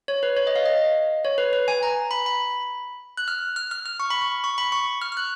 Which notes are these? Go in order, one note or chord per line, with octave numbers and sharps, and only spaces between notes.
C#5
B4
C#5
D#5
F5
D#5
C#5
B4
B4
G#5
A#5
B5
B5
F#6
F6
F6
F6
F6
C#6
B5
C#6
C#6
B5
C#6
F6
F6
F#6